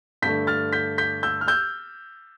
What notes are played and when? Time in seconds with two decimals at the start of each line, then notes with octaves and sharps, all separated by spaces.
0.22 G2 D3 A3 G6 B6
0.47 F6 A6
0.73 G6 B6
0.98 G6 B6
1.23 E6 G6
1.41 F6
1.48 E6 G6